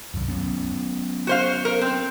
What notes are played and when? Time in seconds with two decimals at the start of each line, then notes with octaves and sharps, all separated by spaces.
0.14 C2 F#2
0.28 F#3 B3 C#4
1.27 F#4 C5 F5
1.65 A#4
1.81 C4